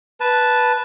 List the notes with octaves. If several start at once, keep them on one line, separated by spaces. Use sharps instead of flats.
B4 A5